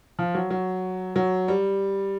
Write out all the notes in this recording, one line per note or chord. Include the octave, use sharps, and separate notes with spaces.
F3
F#3
F#3
F#3
G3